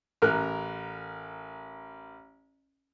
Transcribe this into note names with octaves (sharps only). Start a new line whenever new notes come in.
A1 A#4 F6 F#6